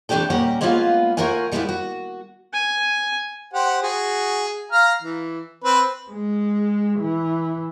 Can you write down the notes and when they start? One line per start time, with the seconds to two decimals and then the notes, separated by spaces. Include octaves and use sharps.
0.09 C3 E3 A3 D4 G4 A4
0.30 D#2 A#2 G3 C#4 A#4 F#5
0.61 G#3 A#3 B3 C#4 F4 F5
1.17 A3 F4 A#4 C#5 F#5 G#5
1.52 C#3 G3 A3 B3 E4 F4
1.69 F#4
2.53 G#5
3.54 G4 C5 F#5
3.82 F#4 G#4
4.72 F5 A#5 F6
5.02 E3
5.64 C4 B4
6.11 G#3
7.00 E3